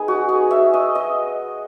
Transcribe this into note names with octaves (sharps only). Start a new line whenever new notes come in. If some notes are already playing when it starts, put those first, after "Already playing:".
Already playing: B3 D#4 G#4
F#4
G#4
E5
D#5
D#5